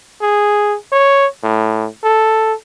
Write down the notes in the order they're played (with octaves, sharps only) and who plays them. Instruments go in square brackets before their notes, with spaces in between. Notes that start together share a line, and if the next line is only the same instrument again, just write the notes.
[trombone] G#4
C#5
A2
A4